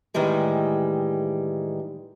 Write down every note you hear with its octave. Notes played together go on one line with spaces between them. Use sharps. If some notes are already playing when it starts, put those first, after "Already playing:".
A2 D#3 E3 G3 G#3